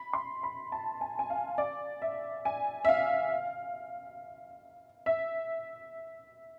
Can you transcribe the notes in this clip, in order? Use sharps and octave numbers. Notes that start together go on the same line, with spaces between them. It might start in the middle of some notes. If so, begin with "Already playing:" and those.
Already playing: B5
C6
B5
A5
G#5
G#5
F5
D5
E5
G#5
E5
F5
E5